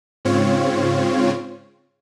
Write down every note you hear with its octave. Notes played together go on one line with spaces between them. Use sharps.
G#2 C#3 C4 F4 C#5